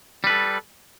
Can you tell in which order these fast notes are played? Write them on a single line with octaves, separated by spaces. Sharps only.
G3 B4 A4